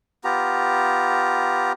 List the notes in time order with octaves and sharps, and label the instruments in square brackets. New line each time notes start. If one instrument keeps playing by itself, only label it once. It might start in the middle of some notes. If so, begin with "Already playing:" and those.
[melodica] B3 F4 G4 A#5